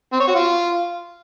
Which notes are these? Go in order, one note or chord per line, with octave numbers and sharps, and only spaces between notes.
C4
C#5
F#4
F4